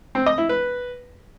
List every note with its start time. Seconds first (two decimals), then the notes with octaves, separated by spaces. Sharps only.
0.15 C4
0.26 D#5
0.38 E4
0.49 B4